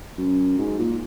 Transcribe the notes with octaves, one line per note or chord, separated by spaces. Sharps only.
F#2
G#2
A#2